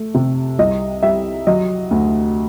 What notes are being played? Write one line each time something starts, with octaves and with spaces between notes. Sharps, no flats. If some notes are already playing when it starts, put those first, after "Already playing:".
Already playing: A3
C3
C2 D#5
G3 E5
F#3 D#5
D2